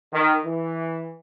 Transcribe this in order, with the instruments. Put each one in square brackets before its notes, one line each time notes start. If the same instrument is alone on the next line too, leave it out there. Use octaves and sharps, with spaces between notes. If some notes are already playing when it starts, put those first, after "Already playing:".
[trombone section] D#3
E3